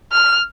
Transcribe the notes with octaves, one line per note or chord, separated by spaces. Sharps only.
F6